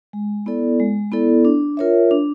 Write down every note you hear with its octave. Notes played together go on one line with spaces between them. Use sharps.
G#3
B3 E4 A4 D5
G#3
B3 E4 A4 D5
D4
F4 A#4 C#5 E5
D4